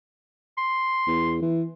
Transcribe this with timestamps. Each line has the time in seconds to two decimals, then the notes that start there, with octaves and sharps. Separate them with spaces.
0.58 C6
1.07 E2
1.42 E3